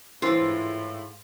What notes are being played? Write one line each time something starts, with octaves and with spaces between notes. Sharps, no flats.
A2 E3 D4 F4 C5 E6
G#2